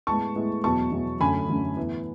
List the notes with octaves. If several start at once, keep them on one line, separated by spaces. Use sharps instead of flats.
A2 G#3 B3 A5 C#6
A2 G#3 B3
E2 B2 F#3 A5 C#6
E2 B2 F#3
F#2 D3 A3 C#4 G#5 B5
F#2 D3 A3 C#4
A2 E3 B3